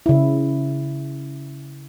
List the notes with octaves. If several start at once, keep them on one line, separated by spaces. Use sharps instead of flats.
C#3 E4